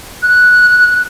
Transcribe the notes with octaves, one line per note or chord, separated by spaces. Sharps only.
F#6